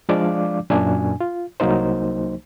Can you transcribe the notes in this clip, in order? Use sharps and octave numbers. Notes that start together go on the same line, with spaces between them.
F3 G#3 D4 D5 F5 D6
F#2 A#2 D4 G#5
F4
C2 F#3 A#3 D#4 C5